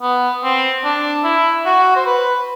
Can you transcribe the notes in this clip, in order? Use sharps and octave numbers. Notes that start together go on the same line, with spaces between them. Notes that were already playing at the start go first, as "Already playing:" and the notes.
B3
C4
D4
E4
F#4
C5
B4